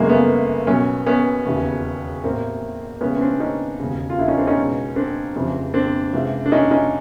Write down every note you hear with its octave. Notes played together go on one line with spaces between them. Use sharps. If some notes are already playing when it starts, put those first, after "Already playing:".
Already playing: G1 F#2 C#3 E3 G#3 A#3
A3 B3
B1 B2 B3 C#4
B3 C#4
E1 D#2 C#3 E3
A1 A2 E3 A#3 C4
C#2 C#3 E3 B3 C#4
C#4
C4 D4
C#4 D#4
E1 D#2 C#3
F4
D4 E4
C#4 D#4
C4 D4
C#4 D#4
C#2 B2
C4 D4
F1 F2 C#3 E3
C4 D4
C#2 C3 E3
D4
C#4 D#4
C#4 D#4